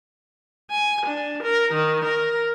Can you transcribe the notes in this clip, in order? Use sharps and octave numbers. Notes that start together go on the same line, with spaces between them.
G#5
D4
A#4
D#3
A#4